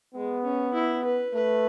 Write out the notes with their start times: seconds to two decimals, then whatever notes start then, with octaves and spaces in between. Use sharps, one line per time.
0.15 G#3 B3
0.45 C#4
0.74 E4
1.05 B4
1.34 A3 B4